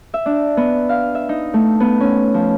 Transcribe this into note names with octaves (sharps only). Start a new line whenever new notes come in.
E5
D4
B3
F5
E5
D#4
A3
B3
C#4
F3